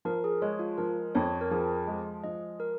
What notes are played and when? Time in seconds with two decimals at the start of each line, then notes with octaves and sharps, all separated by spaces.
0.05 F3 A#4
0.24 G#4
0.42 G#3 C#5
0.59 F4
0.78 F3 A#4
1.15 F2 C#5
1.41 A#4
1.51 F3 G#4
1.87 G#3
2.24 F3 D#5
2.60 A#4